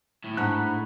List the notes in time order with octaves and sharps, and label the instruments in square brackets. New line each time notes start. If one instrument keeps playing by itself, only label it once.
[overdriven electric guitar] A2
[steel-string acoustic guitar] G#2 D4 F#5 [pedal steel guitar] A#5 B5 F#6